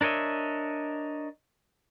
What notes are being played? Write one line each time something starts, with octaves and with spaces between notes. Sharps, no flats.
D4 A#4 C#5 D#5 E5